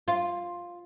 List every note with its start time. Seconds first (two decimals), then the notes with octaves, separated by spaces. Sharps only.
0.08 F4